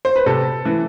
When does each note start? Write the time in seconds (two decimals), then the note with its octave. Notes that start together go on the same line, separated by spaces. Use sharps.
0.05 C5
0.16 B4
0.26 C3 A4
0.65 E3